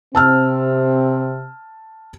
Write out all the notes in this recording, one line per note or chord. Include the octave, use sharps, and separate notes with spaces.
C3 C4 A5 E6 F6